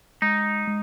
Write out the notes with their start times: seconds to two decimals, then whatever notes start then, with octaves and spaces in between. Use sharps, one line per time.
0.22 G#3 D#4
0.68 G#3